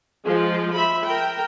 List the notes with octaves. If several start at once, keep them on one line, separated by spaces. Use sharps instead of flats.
F3 G#3 F4
E5 B5
A#4 G5